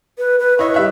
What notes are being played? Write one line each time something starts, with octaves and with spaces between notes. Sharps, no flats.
B4
B4
E4 C#5 D#5 C#6
G3 E5 F#6